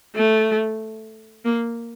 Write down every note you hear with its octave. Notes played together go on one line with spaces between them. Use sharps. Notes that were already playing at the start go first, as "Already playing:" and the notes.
A3
A#3